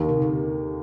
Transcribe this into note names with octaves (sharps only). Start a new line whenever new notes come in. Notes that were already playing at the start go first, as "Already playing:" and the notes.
Already playing: D#2 D#3 A#3
C3
D3